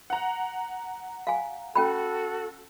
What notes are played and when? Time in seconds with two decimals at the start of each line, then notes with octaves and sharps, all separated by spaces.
0.10 F#5 A#5
1.27 F5 G#5
1.75 C#4 F#4 A4 G5 B5